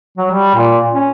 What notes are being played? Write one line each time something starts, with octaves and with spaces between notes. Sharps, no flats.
F#3
G3
A#2
C#4